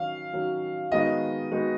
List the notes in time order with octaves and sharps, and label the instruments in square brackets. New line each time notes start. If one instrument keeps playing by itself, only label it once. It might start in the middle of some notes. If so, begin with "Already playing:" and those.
Already playing: [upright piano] D#3 F#3 C#4 F#4 [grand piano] F5
[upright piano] D#3 F#3 C#4 F#4
[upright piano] D#3 G#3 B3 D#4 F#4 [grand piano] D#5
[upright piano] D#3 G#3 B3 D#4 F#4